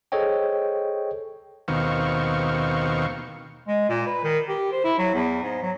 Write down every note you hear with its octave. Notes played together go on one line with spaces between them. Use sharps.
G#4 A4 C5 C#5 D#5 G5
D#2 B2 D#3 C4 F5 C#6
G#3
A#2
B4
D#3
G4
C5
E4
F#3
E2
G#2
F#3